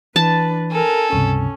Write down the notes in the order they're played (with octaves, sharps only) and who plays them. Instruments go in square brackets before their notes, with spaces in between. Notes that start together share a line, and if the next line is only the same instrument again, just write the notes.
[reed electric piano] E3 [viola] D4 B4 [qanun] A5
[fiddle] A4 [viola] A#4 G#5
[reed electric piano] C#2 G2 C3 [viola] C#4